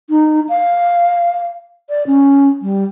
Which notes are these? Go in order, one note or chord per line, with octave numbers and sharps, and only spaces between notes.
D#4
F5
D5
C#4
G3